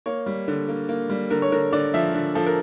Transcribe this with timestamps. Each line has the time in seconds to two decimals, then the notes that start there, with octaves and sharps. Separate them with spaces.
0.06 A#3 C#5
0.26 G3
0.48 D3
0.69 A#3
0.89 A#3
1.09 G3
1.30 D3 A#4
1.42 C#5
1.52 D3 A#4
1.73 D3 D5
1.94 F3 E5
2.14 D3
2.35 F3 A4
2.46 A#4